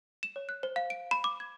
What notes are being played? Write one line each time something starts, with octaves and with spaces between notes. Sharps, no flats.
E7
C#5
F#6
C5
F5
D7
B5
D6
G#6